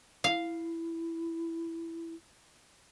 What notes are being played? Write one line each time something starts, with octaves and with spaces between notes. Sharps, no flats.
E4 F5